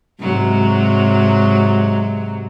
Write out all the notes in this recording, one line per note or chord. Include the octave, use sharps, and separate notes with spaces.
G#2 C3 F#3